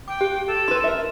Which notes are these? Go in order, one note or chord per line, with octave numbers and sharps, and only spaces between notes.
G5 D6
G4
A4
E4 B4 C6
A#4 E5